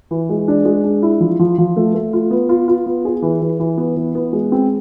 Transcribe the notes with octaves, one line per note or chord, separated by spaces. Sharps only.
E3
G#3
D4
G#3
D4
E4
F3
F3
F3
A3
A3
F4
B3
F4
F4
B3
G#4
E3
E3
E3
B3
E3
B3
G#3
C4